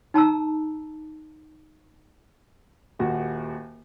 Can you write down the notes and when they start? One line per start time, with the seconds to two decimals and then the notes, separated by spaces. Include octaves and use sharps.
0.14 D#4 A5 A#5 E6
2.99 D#1 D#2 F#4